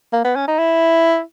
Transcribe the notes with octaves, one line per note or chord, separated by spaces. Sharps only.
A#3
B3
C#4
D#4
E4